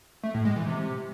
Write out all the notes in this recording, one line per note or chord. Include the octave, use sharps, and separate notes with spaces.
A3
A2
G#3
E3
C3